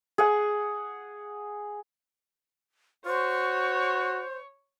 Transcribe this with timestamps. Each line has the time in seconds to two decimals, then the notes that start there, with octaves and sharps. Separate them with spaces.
0.18 G#4 F#5
3.06 F#4 C5 C#5